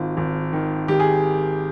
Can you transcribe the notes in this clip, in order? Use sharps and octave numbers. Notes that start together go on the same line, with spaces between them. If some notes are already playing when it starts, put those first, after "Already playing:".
Already playing: G#1 D#3 F4
G#1
D#3
D#3 G4
G#4